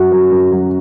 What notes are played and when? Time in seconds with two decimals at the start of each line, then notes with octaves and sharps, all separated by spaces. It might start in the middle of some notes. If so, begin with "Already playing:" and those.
Already playing: F#2 F#3 F#4
0.12 F#3
0.31 F#2
0.51 F#3